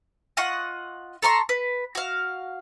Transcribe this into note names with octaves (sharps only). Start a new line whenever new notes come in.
F4 D#5 F#5 C#6
A4 A#5 C6 C#6
B4
F#4 F5